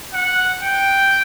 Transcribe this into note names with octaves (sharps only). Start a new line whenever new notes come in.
F#5
G5